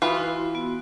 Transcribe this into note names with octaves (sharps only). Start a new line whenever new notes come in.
E3 F4 F#4 D#6
E4 F#4 C6
B3 F#4